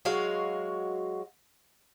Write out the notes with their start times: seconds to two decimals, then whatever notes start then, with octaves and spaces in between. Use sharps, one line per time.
0.05 F#3 G#3 F#4 F5